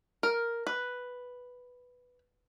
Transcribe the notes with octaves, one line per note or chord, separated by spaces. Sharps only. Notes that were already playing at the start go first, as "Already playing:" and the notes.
A#4
B4